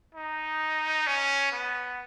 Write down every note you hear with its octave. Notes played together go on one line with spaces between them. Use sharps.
D#4
C#4
B3